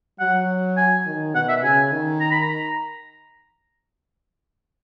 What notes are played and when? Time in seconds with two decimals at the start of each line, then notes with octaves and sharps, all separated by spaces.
0.20 F#3 F#5
0.77 G#5
1.06 D#3
1.35 B2 F#5
1.49 E5
1.63 C#3 G#5
1.92 D#3
2.21 A#5
2.31 B5
2.42 A#5